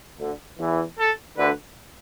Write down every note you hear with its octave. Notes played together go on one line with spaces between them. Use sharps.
D2 D3
E2 E3
A4
D2 D3 B4